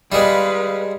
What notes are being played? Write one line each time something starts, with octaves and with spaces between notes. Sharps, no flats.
G3 G#3 B4 F5